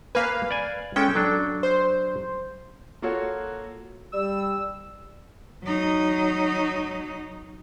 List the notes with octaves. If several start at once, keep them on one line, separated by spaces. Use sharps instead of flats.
A#3 B4 F5 G#5
D5 G#5
G#3 C#4 A4 G5
F#3 D4 A4
C5
A#3 F4 F#4 A4 C#5
G3 E6
F#3 D#4